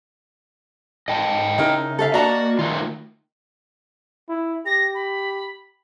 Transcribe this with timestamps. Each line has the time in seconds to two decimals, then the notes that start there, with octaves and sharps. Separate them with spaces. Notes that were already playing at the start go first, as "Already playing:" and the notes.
1.08 G#2 D#5 G5 A5
1.58 C#3 D#4 E4 A#4
1.99 A4 E5 F5
2.14 A#3 D4 F#4 D#5 A5 A#5
2.59 D#3 F#3 A3 F4
4.29 E4
4.66 G4 A#6
4.95 B5